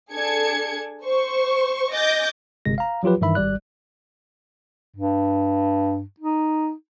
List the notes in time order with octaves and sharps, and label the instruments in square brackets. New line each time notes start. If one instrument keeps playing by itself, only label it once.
[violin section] D4 G#4 A4 G#6 C#7
C5 C#6
D#5 G#5 D6 G6 A6 A#6
[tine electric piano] G1 C3 G#3 A#6
F5 A#5
F3 F#3 F4 G4 B4
G2 D#3 E3 E5 B5
G#1 G3 D5 F#6
[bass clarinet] G2
D#4